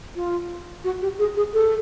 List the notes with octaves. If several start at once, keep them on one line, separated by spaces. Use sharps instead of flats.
F4
F#4
G4
G#4
G#4
A4